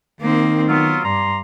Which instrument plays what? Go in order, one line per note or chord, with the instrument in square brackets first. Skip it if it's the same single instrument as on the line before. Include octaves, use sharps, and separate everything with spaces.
[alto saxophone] D#3 [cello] A#3 C4
[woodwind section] F#3 F4 [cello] B3
[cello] G2 [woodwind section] D5 A#5 C6